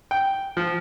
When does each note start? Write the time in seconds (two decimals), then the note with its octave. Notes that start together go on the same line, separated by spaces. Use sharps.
0.11 G5
0.57 F3